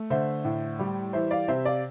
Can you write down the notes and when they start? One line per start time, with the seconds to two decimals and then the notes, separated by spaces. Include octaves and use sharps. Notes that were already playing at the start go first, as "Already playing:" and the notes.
Already playing: A3
0.10 D3 C5 E5
0.44 A2
0.79 G3
1.13 E3 C5 E5
1.31 D5 F5
1.48 C3 C5 E5
1.65 D5 F5